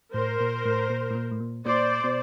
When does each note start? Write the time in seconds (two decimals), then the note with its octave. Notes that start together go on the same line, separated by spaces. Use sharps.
0.14 A2 A#4 C5
0.40 A#2
0.65 A2
0.90 A#2
1.11 A2
1.15 A#2
1.31 A2
1.40 A#2
1.66 A#2 C5 D5
2.04 B2